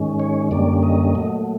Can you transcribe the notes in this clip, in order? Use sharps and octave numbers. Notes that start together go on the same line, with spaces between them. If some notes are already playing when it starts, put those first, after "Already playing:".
Already playing: G#2 D#3 G#3 C#4
C#5
F#2 D3 G3 A#3 C#4 D5
D#5
A#2 F#3 A3